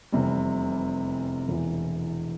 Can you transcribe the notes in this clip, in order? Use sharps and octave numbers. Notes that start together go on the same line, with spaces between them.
F1 E2 C3 G3
E1 E2 E3